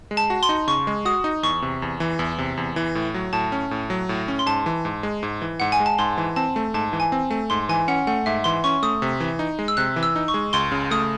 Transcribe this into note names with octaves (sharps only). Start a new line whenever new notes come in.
G#3
A5
F#4
C6
D#4
C#3 C#6
G#3
F#4 D#6
D#4
E2 C#6
C3
E2
E3
E2
C3
E2
E3
A2
F#3
A2 A5
C#4
A2
F#3
A2
C#4
C6
G#2 A5
E3
G#2
G#3
G#2
E3
G#2 F#5
G#5
G#3
A5
G#2 C6
E3
C4 A5
A3
G#2 A5
E3
G#5
C4
A3
G#2 C6
E3 G#5
C#4 F#5
A3 F#5
G#2 E5
E3 C6
C#4 C#6
A3 D#6
C3
E3
D#4
G#3
E6
C3 F#6
E3
E6
D#4
C#6
G#3
C#2 C6
C#3
A3 D#6